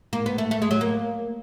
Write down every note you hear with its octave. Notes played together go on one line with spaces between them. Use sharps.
A#3
B3
A3
A3
G#3
F#3
A#3